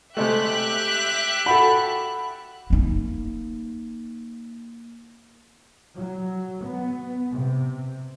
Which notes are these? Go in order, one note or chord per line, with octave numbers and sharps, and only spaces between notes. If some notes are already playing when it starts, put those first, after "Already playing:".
C3 G#3 A3 G4 E5 F#6
F#4 A4 B5
A#3 D#4
F#3
B3
C3